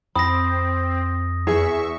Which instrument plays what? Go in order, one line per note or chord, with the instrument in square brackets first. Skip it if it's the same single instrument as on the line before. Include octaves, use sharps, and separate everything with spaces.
[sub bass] F2 [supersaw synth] C4 [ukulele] B5 [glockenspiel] D#6 A#6
[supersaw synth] E2 E5 C#6 [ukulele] G#4